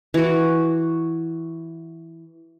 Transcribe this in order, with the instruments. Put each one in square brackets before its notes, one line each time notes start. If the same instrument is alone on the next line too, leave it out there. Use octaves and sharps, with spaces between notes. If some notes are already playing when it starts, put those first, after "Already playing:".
[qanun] E3 F#4